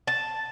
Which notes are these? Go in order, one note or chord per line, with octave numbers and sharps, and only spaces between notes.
A5